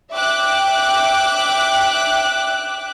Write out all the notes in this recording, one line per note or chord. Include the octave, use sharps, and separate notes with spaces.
E5 G5 D6 F#6